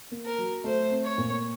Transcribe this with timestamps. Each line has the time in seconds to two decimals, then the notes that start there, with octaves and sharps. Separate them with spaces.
0.11 A#3
0.25 A#4
0.38 F#3
0.64 A3 C5
0.91 C4
1.04 C#5
1.18 A#2